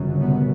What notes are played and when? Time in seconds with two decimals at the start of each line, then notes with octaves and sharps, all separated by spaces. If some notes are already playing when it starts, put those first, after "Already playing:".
Already playing: G1 F#2 C#3
0.20 B2 B3